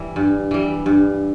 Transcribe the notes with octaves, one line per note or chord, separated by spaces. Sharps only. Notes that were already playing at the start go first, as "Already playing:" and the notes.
Already playing: E3 G3
G2
E3 G3
G2